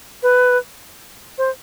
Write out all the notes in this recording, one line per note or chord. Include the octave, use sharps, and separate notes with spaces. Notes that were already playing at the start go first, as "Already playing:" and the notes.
B4
C5